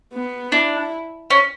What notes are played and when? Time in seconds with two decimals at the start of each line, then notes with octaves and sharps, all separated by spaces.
0.14 B3
0.52 D4 E4
1.30 C#4